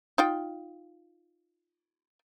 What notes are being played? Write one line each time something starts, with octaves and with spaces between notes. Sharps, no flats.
D#4 F4 G5